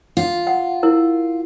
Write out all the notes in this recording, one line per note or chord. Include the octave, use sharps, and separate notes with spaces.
F4
F#5
E4 A#4